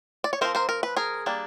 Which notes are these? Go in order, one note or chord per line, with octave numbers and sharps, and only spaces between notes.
D5
C#5
F3 G#3 C4 A#4 C5
A#4 C5
A#4
B4
G#4 A#4
G3 A#3 D4